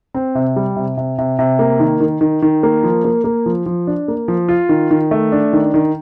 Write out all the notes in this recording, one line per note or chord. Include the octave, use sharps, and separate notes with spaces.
C4
C3
G3
C3
C3
C3
C3
A#3
D#3
D#3
D#3
D#3
A#3
F3
A#3
A#3
F3
F3
D4
A#3
F3
F4
D#3
D#3
A3
D4
D#3
D#3